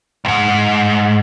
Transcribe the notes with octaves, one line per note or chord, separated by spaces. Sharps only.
C#2 G#2